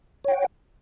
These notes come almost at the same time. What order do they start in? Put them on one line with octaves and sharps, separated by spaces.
C#5 G5 F#5